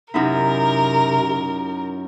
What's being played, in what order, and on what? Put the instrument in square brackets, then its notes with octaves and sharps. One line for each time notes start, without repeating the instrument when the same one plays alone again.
[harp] F#2 D#4 E4 [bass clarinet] C3 [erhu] A#4